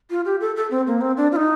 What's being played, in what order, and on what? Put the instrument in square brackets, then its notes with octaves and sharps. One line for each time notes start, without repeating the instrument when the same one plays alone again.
[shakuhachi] F4
G4
A4
A4
C4
A#3
C4
D4
F4
D#4